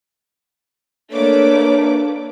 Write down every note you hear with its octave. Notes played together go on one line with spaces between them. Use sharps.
A3 A#3 D4 B4 C#5 D6